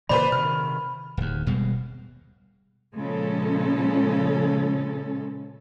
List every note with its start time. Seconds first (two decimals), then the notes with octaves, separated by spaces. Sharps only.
0.09 A#2 C#3 E3 B4 C5 D5 B5
0.32 C3 D#3 F6
1.17 D1 D#2
1.47 D#1 B2 G3 G#3
2.97 A#2 C#3 F3 G#3 C#4 A4